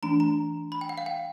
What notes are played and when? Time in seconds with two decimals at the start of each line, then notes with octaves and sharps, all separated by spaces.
0.02 E3 A3 D4 A#5
0.20 A#5
0.72 B5
0.81 G5
0.89 F#5
0.98 F5
1.06 G5